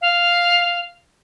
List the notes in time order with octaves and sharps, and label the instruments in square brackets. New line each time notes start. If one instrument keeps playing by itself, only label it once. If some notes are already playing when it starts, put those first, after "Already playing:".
[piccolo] F5